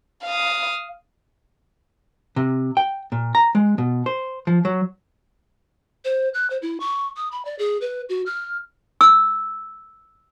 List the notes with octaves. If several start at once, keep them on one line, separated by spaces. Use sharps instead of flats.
F5 D#6
C3
G5
A#2
A#5
G#3
B2
C5
F3
F#3
C5
F#6
C5
E4
C#6
D#6
B5
D5
G#4
B4
F#4
F6
E6